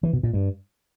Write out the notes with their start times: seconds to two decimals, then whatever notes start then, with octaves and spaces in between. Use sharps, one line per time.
0.03 E3
0.13 B2
0.23 A#2
0.33 G2